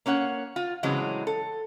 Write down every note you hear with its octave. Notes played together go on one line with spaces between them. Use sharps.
A#3 C#4 C#5 F#5
F4
A2 C#3 E3 F#3 G#3 C4
A4